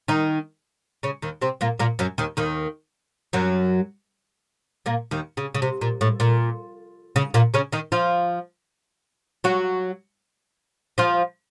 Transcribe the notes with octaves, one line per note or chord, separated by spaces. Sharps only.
D#3 D#4
C#3 C#4
D#2 D#3
C3 C4
A#2 A#3
A#2 A#3
F#2 F#3
D#2 D#3
D#2 D#3
F#2 F#3
A#2 A#3
D#2 D#3
C#3
C#3
C3
A#2
A2
A#2
C#3
A#2 A#3
C#3 C#4
D#3 D#4
F3 F4
F#3 F#4
F3 F4